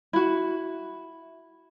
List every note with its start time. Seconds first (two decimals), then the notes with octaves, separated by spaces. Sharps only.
0.13 E4 F#4